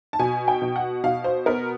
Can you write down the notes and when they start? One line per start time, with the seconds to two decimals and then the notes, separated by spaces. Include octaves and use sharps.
0.13 A5
0.19 B2 G#5
0.48 G5
0.62 B2
0.76 F#5
1.04 B2 F5
1.24 C5
1.46 B3 A#4